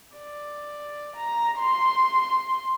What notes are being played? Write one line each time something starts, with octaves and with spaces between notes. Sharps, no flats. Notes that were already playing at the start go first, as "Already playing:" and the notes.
D5
A#5
C6